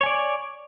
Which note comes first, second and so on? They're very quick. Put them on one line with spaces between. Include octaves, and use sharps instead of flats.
C#5 G#5 D5